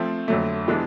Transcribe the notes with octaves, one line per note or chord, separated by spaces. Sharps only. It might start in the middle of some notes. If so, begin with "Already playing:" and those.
Already playing: F3 A3 C4
F2 D3 F#3 A3
C3 E3 G#3 B3 D4